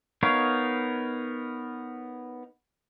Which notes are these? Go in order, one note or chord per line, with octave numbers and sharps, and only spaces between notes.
B3 D#4 A#4 C#5 F5